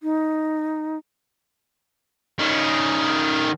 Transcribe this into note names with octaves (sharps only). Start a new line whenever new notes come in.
D#4
D#3 C#4